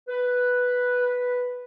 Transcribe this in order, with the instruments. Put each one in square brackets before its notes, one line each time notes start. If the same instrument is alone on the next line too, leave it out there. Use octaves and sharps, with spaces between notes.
[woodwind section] B4